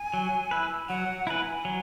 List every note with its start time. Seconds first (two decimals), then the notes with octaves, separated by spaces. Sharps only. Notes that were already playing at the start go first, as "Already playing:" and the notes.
Already playing: G#5
0.14 F#3
0.51 E4 B4
0.89 F#3 F#5
1.27 E4 B4 G#5 A#5
1.65 F#3